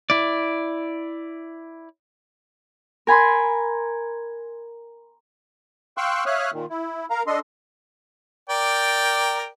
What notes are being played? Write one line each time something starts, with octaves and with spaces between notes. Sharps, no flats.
E4 D5
A#4 G#5 B5 C6
F5 G5 C6 C#6 E6 F#6
C#5 E5 F5 D#6 F6 F#6
A#2 D#3
E4
A#4 F5 A#5
D4 A4 D#5 C6
A#4 D5 G5